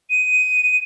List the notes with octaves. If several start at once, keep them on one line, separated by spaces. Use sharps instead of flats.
D#7